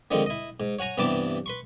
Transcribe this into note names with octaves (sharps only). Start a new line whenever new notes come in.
D3 D#3 F3 G#3 C4
E4 D#5
G#2
C#5 F#5 G#5 A#5 C#6
G2 C3 E3 B3 A5 D6
B4 C6 C#6